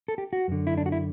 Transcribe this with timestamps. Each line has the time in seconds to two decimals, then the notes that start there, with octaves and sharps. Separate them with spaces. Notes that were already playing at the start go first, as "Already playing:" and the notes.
0.08 A4
0.18 G4
0.33 F#4
0.48 F#2 D3
0.67 E4
0.78 D4
0.86 F#4
0.92 E4